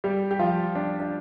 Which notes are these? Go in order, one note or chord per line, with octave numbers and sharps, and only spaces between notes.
G3 G4
G4
F3 F4
D4
D4